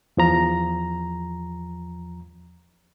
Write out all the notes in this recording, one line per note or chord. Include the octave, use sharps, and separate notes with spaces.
E2 F3 A#5